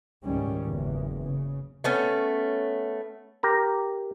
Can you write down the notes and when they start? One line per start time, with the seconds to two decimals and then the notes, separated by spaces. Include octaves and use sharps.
0.25 C#2 G#2 D#3 G3 C#4
0.67 F#1 E2
1.22 C#3
1.84 A3 B3 C#4
3.43 G4 A#4 A#5